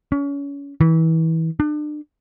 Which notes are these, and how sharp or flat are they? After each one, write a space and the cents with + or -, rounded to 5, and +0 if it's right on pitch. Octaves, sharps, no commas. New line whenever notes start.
C#4 +30
E3 -25
D4 +35